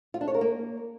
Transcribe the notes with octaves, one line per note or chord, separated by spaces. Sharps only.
F4
D4
C#5
A#4
A#3